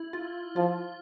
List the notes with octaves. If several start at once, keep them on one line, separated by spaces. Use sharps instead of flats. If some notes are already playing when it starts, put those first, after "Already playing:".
Already playing: E4
F4
F3 F4